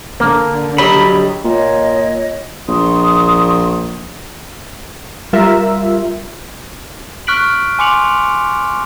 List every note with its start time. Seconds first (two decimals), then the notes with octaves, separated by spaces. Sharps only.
0.20 D3 A#3
0.78 F#3 G3 D#5 B5
1.45 A#2 C#5 D#5
2.68 A#1 C6 C#6 D#6
5.33 G3 F4 A#4 E5
7.27 C#6 F6 F#6 B6 D7 F#7
7.79 G#5 C6 D6 C#7 F7 F#7